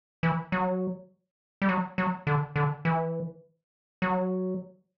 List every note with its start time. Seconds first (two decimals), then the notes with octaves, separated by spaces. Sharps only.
0.23 E3
0.52 F#3
1.62 G3
1.69 F#3
1.98 F#3
2.27 D3
2.56 D3
2.85 E3
4.02 F#3